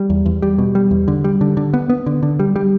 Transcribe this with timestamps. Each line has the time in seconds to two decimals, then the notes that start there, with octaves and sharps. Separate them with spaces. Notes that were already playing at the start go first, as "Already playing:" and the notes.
Already playing: G3
0.10 E2
0.26 E2
0.42 G3
0.58 B2
0.75 G3
0.91 E2
1.08 D3
1.24 G3
1.41 D3
1.57 D3
1.74 B3
1.90 B3
2.06 D3
2.23 D3
2.39 G3
2.56 G3